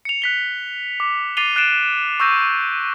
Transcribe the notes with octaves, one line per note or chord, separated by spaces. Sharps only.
C#7 F7
F#6 B6 G7
D6
D6 A6 C7 D#7 F7 G7
F#6 A6 C7 D7 E7
C#6 E6 G6 A#6 D#7